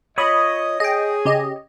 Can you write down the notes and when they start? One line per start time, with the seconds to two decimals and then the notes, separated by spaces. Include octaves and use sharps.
0.18 F4 C#5 D#5 B5 C#6 D#6
0.80 G#4 D#5 G5
1.25 C#3 G4 D#5